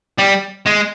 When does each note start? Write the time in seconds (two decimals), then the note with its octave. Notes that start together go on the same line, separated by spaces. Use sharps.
0.18 G3
0.66 G#3